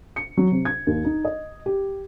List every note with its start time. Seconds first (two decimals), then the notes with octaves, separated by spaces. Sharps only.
0.16 C#7
0.37 F#3
0.51 C3
0.65 G#6
0.87 D#2
1.05 D#4
1.25 D#5
1.66 G4